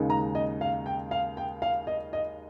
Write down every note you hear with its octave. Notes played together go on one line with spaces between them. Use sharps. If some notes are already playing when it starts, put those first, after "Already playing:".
Already playing: D#2 C#3 G#3 D#4
A#5
D#5
F5
G5
F5
G5
F5
D#5
D#5